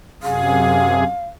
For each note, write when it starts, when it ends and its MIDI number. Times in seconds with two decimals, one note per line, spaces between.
0.23 1.04 42
0.23 1.04 48
0.23 1.04 68
0.23 1.26 77